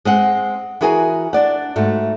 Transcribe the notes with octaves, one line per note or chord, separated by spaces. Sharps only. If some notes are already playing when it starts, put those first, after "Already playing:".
G#3 C4 F#5
E3 F#4 G#4 A#4 G#5
D4 D5 F#5
G#2 A3 F#4